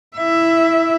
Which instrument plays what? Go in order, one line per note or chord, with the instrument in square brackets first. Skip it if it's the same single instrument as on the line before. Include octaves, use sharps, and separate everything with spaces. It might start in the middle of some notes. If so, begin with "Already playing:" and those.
[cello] E4 E5